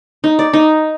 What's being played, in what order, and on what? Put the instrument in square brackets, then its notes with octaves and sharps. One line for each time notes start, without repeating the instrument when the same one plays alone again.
[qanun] D#4
D5
D#4